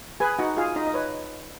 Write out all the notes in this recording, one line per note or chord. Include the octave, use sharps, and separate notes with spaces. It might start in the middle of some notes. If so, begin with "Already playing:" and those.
G#4 B4 G#5
D#4 F#4 F#5
F4 G#4 F5
D#4 D#5
D#5
B4 C#5